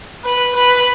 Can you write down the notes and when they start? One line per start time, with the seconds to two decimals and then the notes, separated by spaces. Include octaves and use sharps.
0.25 B4
0.55 B4